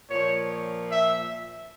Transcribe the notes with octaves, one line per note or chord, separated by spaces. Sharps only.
A#2 F3 C#5
E5